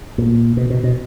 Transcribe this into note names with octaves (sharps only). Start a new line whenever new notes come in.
A#2
B2
B2
B2